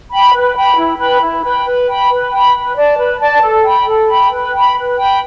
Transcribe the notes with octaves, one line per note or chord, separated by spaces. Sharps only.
G5 B5
B4
G5 B5
E4
B4 G5 B5
E4
B4 G5 B5
B4
G5 B5
B4
G5 B5
B4
D5 A5
B4
D5 A5
A4
G5 B5
A4
G5 B5
B4
G5
B5
B4
G5 B5